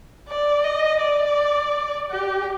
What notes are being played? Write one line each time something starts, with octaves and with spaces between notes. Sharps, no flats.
D5
D#5
D5
G4